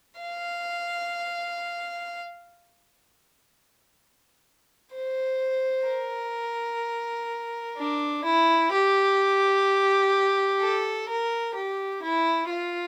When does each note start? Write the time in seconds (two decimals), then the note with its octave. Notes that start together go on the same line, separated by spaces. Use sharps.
0.20 F5
4.94 C5
5.88 A#4
7.77 D4
8.24 E4
8.72 G4
10.61 A4
11.09 A#4
11.56 G4
12.03 E4
12.50 F4